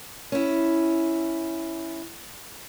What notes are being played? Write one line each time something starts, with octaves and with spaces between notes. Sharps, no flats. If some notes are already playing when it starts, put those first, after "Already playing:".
C#4 E4